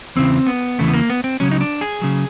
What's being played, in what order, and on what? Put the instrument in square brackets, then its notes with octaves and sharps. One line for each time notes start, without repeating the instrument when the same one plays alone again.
[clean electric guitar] E2 C#3 E3 C4
B3
E2 C#3 E3 A3
B3
A#3
B3
C4
C#2 C#3 F#3 C#4
D#4
D4
G#4
C#3 F#3